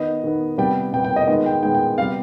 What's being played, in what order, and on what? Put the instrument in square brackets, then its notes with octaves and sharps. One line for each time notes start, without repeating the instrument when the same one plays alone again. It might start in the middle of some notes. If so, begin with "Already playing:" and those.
Already playing: [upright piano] D#3 B3 D#5
D#3 B3
C3 G3 B3 G5
C3 G3 B3 G5
G5
D#5
D#3 G#3 B3 D#5
G5
D#3 G#3 B3 G5
G5
C3 G3 B3 F5